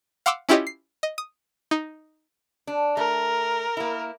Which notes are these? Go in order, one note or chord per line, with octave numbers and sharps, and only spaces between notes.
F5 F#5 C6 D6 E6
C#4 E4 F4 G4 C#5 D#5
C7
D#5
D#6
D#4
D4
A3 A#4
A#3 E4